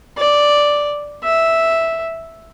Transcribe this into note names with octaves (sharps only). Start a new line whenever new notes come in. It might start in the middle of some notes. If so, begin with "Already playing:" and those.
D5
E5